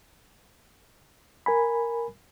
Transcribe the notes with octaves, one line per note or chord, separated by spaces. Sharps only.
A#4 G#5 B5